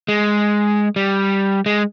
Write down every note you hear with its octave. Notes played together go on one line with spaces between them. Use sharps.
G#3
G3
G#3